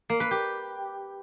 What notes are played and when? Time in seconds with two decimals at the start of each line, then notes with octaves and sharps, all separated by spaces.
0.10 A#3
0.20 B4
0.31 G4